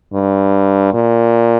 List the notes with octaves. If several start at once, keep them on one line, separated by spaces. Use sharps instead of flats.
G2
A#2